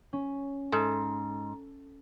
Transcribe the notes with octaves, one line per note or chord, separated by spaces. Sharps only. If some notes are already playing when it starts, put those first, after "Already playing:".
C#4
G#2 A4